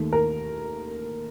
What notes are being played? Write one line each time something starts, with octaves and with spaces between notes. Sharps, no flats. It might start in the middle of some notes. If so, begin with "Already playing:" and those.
Already playing: D#2 D#3 A3
A#4